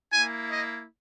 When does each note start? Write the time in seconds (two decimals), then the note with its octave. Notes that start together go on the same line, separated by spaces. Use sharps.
0.13 A#3 E4 G#5
0.50 D#5